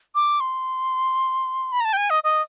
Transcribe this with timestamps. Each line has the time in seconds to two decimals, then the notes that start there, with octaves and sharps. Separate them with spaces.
0.15 D6
0.40 C6
1.72 B5
1.80 A#5
1.85 A5
1.93 G5
1.97 G#5
2.10 D#5
2.23 D#5